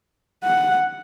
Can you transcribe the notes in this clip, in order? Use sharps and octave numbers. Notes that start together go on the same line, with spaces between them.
F#5